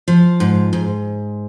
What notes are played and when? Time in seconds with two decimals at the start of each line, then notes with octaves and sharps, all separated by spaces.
0.08 F3
0.40 G#2
0.73 G#2